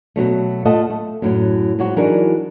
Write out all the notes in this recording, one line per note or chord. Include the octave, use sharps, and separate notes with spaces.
B2 E3 F#3 A3
A3 F4 A4 D#5 F#5 A5
A3
F#2 A2 F#3
G#2 F#3 F#4
E3 F#3 D4 D#4 G#4 A#4